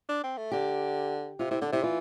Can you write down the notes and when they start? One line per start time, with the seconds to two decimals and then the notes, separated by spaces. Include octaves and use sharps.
0.09 D4
0.23 C4
0.38 A3
0.51 D3 G4
1.39 C3 F4
1.51 C3 E4
1.62 D3 D4
1.72 C3 E4
1.83 E3 F4